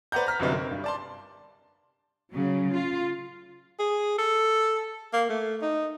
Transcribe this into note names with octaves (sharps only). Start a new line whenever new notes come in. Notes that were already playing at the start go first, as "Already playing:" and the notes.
B4 C5 D5 F#5 A#5 G6
A#5 F6 B6
G1 F#2 C3 C4 D#4 B4
C4 A#4
G2
D5 A5 C6
C#3 F#3
F4
G#4
A4
A#3
A3
D#4